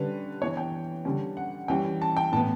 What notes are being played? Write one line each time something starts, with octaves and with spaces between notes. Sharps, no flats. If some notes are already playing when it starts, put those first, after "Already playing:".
Already playing: D3 G3 C#4 B4
E3 B3 C#5
G5
D3 G3 C#4
F#5
E3 G3 C#4 G5
A5
G5
A2 E3 B3 A5